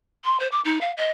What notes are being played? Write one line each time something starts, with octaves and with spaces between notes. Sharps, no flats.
C6
C5
D6
D#4
F5
D#5